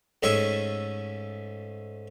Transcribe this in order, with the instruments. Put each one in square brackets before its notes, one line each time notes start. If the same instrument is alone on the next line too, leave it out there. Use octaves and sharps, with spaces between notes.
[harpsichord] G#2 A3 C#4 D#5 E5 C#6